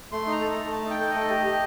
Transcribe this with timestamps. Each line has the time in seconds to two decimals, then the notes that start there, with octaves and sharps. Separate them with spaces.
0.12 A3 C6
0.27 D#4
0.32 A#5
0.41 A4
0.51 A3 A#5
0.71 A3 A5
0.85 D#4
0.91 G5
1.01 A4
1.11 A3 D#5
1.30 G4
1.46 G4